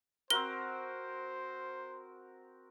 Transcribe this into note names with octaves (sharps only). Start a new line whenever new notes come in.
C4 F#4 A#4 C5 G7